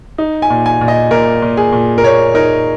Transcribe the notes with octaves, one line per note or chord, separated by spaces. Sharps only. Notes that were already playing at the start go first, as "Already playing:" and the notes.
D#4
G#5
A#2
G#5
A#2
D#5
A#2 A#4
A#2
G#4
A#2
A#4
A#2 C#5
D#4 A#4